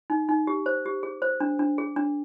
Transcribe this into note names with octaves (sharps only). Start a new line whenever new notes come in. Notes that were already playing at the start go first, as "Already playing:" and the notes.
D#4
D#4
G4
C5
G4
G#4
C5
D4
D4
G#4
D4